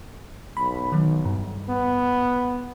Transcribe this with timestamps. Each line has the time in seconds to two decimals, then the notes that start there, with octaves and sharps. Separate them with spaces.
0.57 B1 B5
0.92 D#3 F#3
1.25 G2
1.69 B3